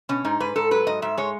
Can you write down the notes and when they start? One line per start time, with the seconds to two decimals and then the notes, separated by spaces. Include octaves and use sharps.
0.09 B2 C#4
0.25 G#2 D#4
0.40 G#2 B4
0.56 G#2 A4
0.71 F#3 B4
0.87 G#2 D#5
1.02 G#2 E5
1.18 G#3 C#5